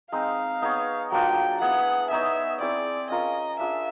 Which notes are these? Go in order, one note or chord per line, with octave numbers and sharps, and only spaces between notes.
G#3 C4 D#4 F5
B3 D#4 G#4 C#5
F#3 A#3 D4 F4 G5
B3 E4 G#4 B4 F#5
B3 D#4 G#4 C#5 E5
C4 E4 G#4 C5 D5
C#4 F4 A#4 D#5
D4 F4 G#4 E5